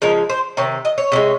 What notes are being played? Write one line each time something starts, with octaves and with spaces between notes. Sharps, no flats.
C#3 F3 G#3 A#4
C5
C3 D#3 C#5
D#5
C#5
C3 D#3 G#3